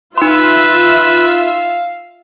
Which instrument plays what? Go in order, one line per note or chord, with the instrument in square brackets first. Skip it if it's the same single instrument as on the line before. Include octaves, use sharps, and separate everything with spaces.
[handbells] D#4 C6 [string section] F4 E5 E6 [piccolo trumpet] B4
[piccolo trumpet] F5